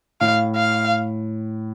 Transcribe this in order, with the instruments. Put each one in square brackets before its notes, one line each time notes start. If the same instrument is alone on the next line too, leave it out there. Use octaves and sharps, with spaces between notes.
[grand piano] A2 [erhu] F5
[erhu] F5